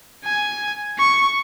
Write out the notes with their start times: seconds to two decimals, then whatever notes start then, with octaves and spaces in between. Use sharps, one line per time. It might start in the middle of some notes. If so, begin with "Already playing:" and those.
0.24 G#5
0.98 C#6